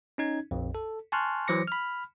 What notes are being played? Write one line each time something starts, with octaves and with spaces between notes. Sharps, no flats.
C#4 D#4 G#6
A#1 F2
A4
G#5 A5 C6 C#6 F6 F#6
E3 F#3 C5 D6 A#6 C#7
B5 F6